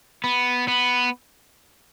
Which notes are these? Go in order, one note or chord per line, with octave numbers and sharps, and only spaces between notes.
B3
B3